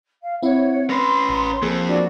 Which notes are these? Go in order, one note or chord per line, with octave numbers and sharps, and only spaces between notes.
F5
C4 E4 C#5 F#5
C#4 B4 C6 A#6 C7
A1 A#5
F2 F3 A#3 G#4
D4 F#4